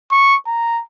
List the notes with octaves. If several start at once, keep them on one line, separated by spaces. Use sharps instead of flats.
C#6
A#5